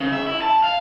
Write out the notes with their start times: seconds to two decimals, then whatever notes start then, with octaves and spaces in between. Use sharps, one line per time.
0.01 C#3
0.12 E5
0.27 E4
0.42 A5
0.64 F5